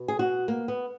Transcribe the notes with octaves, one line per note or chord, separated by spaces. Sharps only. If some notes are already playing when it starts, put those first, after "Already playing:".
Already playing: B2
G#4
F#4
A#3
B3